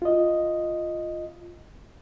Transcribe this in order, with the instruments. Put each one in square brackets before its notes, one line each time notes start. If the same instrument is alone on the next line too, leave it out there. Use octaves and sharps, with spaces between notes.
[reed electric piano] F4 D#5